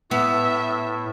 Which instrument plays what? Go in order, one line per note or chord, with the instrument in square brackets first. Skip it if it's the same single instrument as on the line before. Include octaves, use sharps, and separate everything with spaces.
[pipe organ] A2 [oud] B3 [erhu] E5